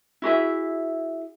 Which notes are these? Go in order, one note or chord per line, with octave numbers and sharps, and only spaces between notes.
E4 F#4 G#4 E5